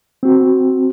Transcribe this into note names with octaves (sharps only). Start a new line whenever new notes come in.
C4 F#4